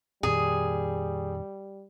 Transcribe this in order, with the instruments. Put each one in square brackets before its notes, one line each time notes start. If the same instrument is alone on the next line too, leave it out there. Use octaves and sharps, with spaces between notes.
[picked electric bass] F2 A#2 D#3 [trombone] G3 [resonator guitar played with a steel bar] G#4